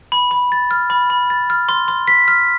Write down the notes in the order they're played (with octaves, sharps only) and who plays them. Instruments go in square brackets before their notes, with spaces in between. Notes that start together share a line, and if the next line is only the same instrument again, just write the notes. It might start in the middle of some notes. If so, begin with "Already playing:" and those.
[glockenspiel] B5
B5
A6
F6
B5
B5
A6
F6
C6
C6
B6
F6